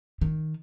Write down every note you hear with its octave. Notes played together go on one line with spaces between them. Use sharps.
D#3